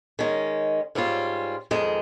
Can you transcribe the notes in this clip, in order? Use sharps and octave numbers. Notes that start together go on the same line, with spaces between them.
D#3 G#3 C#4
G#2 G3 C#4 F4
F2 D#3 G#3